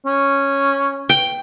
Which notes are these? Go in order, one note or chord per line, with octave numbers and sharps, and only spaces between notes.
C#4
G5